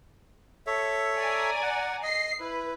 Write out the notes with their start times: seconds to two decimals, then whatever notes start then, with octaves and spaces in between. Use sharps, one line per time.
0.67 A4 C#5 E5
1.17 D5 G#5 A#5
1.62 F#5
2.03 D#5 C7
2.40 E4 B4